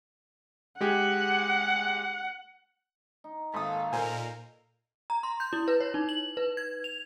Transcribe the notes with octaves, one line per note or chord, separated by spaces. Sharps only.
G#3 G4 G#4 F#5
D#4
G#1 A#3 A4 A#4 F5 D#6
A#2 A4 A#4 C5 G#5 B5
A#5
C6
G6
E4
B4
C#5
D#4
F#7
B4
G#6
F7